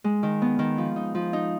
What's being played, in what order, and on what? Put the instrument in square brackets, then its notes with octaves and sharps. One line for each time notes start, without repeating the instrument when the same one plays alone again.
[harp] G#3
D#3
B3
D#3
F3
D#4
F3
D#4